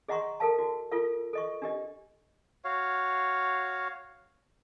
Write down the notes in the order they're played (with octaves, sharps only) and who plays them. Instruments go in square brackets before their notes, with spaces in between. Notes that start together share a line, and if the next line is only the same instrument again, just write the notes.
[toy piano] G#4 D#5 F#5 A#5 C6 C#6
A4 A#4 F5 A5
F#4
F4 A4 A#4 F5
A4 D#5 C#6
D4 G4 D#5
[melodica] F#4 C#5 F5